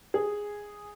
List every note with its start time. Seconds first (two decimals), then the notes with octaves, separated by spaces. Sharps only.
0.14 G#4